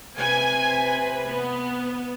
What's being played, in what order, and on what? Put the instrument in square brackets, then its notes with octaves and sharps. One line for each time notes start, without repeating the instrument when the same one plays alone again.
[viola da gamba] C3 C4 B4 [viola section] G#5
[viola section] B3